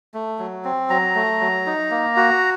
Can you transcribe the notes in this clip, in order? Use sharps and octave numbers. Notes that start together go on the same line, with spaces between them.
A3
F#3
C4
F#3 A#5
A3
F#3
D#4
A#3
F#4